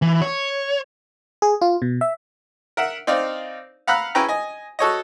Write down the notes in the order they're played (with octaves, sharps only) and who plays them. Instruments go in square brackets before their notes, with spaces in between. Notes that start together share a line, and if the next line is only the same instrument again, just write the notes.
[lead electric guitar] E3
C#5
[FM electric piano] G#4
F4
B2
E5
[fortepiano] A#4 E5 F#5
C4 D#4 D5 F5
F5 F#5 A#5 B5 E6 F#6
C#4 E4 B4 G5 A#5
D#5 G#5
F#4 A4 C#5 D#5